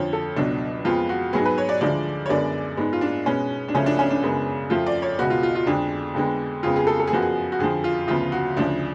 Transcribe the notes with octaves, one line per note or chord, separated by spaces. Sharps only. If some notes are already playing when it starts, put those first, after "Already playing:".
Already playing: F2 D3 F3 C#5
A4
C#2 B2 F#3 D4
F2 F3 G#3 B3 F4
F#4
G#2 F#3 B3 G#4
B4
C#5
D5
D2 D3 F3 G#3 D5
C#5
F#2 D3 G#3 B3 D5
G#2 G#3 B3
F4
D4
B2 G#3 B3 C#4
D4
C#2 C#3 F3 A3 C#4
D4
C#4
D4
F#2 C#3 G#3 B3
F2 F3 A3 F4
D5
C#5
C#2 B2 G#3 B3 F#4
F4
F4
F4
F2 D3 G#3 D4
F2 D3 G#3 B3
F2 C#3 G#3 B3 F4
G#4
A4
A4
G#4
F#2 F3 B3 F#4
G#4
F#4
F2 D3 F3 G#4
F4
D2 C#3 F3 B3 F4
F#4
D2 C#3 F3 D4